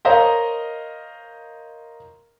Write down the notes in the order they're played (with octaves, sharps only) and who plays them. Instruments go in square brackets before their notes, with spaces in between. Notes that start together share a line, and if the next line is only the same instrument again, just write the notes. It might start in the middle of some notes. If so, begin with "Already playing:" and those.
[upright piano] A#4 C5 C#5 D#5 F5 A#5